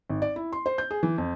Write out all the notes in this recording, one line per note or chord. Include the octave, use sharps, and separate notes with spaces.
G#1
D5
E4
C6
C5
G6
G#4
E3
F2